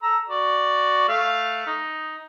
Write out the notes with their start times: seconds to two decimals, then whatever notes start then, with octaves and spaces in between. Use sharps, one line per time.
0.03 A4 A#5 E6
0.28 F#4 D5
1.08 A3 F5
1.67 D#4